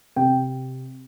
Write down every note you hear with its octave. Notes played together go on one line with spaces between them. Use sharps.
C3 G5